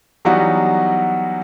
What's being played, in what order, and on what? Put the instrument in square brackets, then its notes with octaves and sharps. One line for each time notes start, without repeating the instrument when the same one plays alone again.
[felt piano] E3 F#3 G3 B3 D#4 F#4